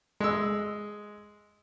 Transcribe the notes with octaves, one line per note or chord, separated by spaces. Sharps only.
G#3 E6